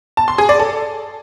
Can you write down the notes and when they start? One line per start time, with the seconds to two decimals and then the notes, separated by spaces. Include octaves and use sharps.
0.17 A5
0.28 C6
0.38 G#4
0.49 D5
0.59 A4